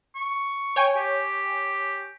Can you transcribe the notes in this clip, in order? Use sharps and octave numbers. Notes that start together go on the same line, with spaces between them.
C#6
C#5 G5 G#5
G4